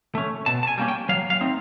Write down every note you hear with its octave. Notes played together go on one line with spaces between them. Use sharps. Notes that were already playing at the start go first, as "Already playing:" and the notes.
A3 C#4
B2 A5
A5
G#5
G3 A#3 C#4
G5
F#3 F5
F5
A3 C4 D#4